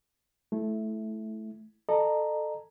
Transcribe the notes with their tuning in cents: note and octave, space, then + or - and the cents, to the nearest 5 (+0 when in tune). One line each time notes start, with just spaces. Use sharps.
A3 -15 E4 +0
A4 +0 D#5 -45 A#5 +0